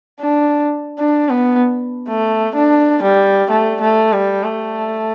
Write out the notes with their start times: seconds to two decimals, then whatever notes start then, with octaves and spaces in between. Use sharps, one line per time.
0.20 D4
0.99 D4
1.30 B3
2.08 A3
2.55 D4
3.02 G3
3.50 A3
3.81 A3
4.12 G3
4.43 A3